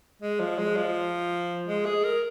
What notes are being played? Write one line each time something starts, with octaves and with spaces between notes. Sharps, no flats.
G#3
F3
G#3
F3
G#3
G#4
A#4